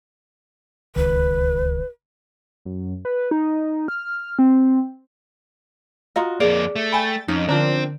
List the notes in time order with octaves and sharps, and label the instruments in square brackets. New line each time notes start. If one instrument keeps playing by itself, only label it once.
[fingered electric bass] D1 C#2 D#3 [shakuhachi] B4
[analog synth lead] F#2
B4
D#4
F6
C4
[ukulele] F4 F#4 D#5 [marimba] F5 A#5
[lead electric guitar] F2 A#3 [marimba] G#4 [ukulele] D5
[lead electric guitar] A3
[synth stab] G5 A6 [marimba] G#5 B5
[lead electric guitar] F2 [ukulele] C#4 [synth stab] D#4
[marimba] D3 [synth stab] F3 D4 A#4 [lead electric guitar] C4